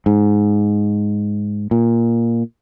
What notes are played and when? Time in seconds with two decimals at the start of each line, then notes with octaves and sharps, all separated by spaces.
0.06 G#2
1.71 A#2